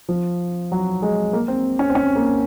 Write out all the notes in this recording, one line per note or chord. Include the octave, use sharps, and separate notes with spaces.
F3
F#3
G#3
A#3
C4
C#4
C4
C#4
A#3